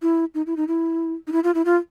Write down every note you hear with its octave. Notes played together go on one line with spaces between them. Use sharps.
E4
D#4
E4
D#4
E4
D#4
E4
F4
E4
F4